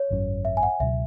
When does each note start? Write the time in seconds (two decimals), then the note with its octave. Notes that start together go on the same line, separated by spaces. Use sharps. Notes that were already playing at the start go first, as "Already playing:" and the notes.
Already playing: C#5
0.11 G#1 F#2 F#3 C#4
0.45 E5
0.57 G#5
0.63 F#5
0.80 C#2 B2 F#3 E5